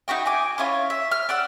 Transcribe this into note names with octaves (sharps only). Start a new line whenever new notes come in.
D#4 E4 F#4 G5
G#5 D6
C#4 E4 F4 C#5
E5
F6
D5 F#5 E6